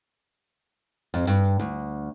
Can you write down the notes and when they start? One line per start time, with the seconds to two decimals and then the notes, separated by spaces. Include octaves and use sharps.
1.14 F2
1.27 G2
1.60 D2